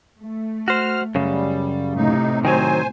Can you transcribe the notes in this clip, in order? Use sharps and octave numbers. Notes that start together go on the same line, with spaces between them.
A3
F#4 C5 F6
F#2 C#3 G3
A2 C3 D#4
D#3 F#3 C5 G#5